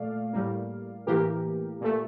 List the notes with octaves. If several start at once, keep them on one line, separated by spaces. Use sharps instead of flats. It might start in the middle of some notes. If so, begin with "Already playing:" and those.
Already playing: A#2 A3 D5 F5
A2 G3 A#3
A2 E3 A#3 G4 A#4
A#2 A3